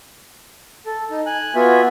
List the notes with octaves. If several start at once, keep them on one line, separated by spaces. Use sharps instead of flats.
A4
D#4
G#5 F#6
B3 F4 F#4 E5 G#5